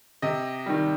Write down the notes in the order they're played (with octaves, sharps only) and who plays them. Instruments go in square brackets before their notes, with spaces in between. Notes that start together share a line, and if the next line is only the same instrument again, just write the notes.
[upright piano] C3 D#5
D#3 G3